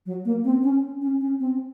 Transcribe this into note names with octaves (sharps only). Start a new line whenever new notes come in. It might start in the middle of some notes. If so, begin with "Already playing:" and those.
F#3
A#3
C4
C#4
C#4
C#4
C4